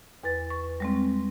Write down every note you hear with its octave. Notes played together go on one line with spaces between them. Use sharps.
E2 B4 A6
C#6
G3 G#3 C4